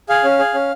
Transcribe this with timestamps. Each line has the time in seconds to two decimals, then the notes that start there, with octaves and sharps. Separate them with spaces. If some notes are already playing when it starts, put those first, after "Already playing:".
0.09 G#4 F5
0.24 C#4
0.39 G#4
0.54 C#4